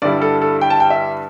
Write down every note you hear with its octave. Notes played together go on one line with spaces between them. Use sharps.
G2 D3 G3 E4 D5
A4
A4
G5
A5
G5
E5